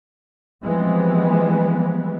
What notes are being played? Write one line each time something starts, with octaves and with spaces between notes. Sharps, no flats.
E3 F3 G3 G#3 B3 C4